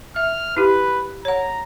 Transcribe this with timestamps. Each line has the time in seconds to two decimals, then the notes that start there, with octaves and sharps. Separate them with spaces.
0.16 E5 F6
0.57 E4 G4 B4
1.25 C#5 F#5 A#5